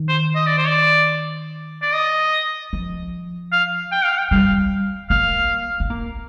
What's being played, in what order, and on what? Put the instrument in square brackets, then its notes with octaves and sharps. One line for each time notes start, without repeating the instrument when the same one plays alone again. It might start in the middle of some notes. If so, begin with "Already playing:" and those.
Already playing: [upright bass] D#3
[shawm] C5
D#5
D5
C5
D5
D5
D#5
[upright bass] F3
[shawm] F5
G5
F5
G5
[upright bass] G3 [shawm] F5
[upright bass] A#3 [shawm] F5
[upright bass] C4
A#3